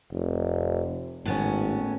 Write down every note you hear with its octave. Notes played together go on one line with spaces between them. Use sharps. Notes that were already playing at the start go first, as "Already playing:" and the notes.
F1
G#1 A2 B3 C#4